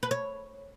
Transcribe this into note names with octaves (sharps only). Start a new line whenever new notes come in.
B4
C#5